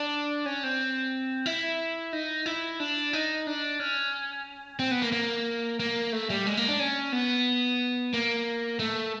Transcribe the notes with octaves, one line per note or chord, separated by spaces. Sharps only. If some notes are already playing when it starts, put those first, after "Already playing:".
Already playing: D4
C#4
C4
E4
D#4
E4
D4
D#4
D4
C#4
C4
B3
A#3
A#3
A#3
A3
G3
G#3
A#3
D4
C#4
B3
A#3
A3